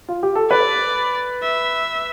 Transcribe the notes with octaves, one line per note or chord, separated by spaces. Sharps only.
F4
G4
A4
B4 D5
E5